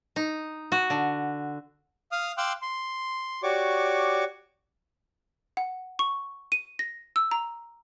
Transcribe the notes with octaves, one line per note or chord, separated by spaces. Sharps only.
D#4
F#4
D3
F5 D#6 F6
F5 G5 C6 D6 E6 F#6
C6
F#4 G4 C#5 D5 C#6 D6
F#5
C#6
D#7
A#6
E6
A#5